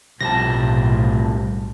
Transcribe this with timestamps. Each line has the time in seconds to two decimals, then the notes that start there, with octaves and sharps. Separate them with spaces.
0.21 B1 A2 C3 F3 G3 A5 A#6